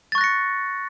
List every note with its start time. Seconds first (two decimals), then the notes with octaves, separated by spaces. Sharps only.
0.12 A6
0.15 C#6
0.18 F#6
0.21 A#6
0.24 C#7